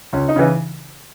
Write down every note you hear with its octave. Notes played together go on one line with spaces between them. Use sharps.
C#2 C#4
D#4
C#3 E3